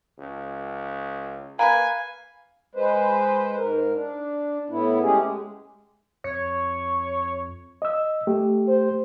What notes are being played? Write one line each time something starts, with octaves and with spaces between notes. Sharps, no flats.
C#2
A#3 B4 F5 G#5
G#3 B4 C5
G#2 A#4
D4
A2 B3 E4
G#3 A3 C#4 G4 G#4
G#3
F2 C#5
D#5 E6
A3 G4
C5